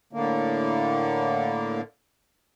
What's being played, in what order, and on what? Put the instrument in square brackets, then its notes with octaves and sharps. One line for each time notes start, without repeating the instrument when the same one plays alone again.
[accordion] A2 D3 A#3